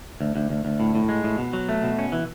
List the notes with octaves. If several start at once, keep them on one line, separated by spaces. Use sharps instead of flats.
D2
D2
D2
D2
A2
A2
G#3
A2
B2
F#3
A3
B2
C#4
E3